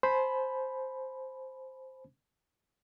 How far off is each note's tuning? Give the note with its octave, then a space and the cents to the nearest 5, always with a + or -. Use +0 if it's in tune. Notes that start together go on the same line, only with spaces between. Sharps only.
C5 +0 G#5 +45 B5 +0